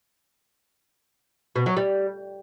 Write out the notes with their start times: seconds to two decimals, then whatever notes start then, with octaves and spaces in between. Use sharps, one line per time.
1.56 B2
1.66 F#3
1.77 G3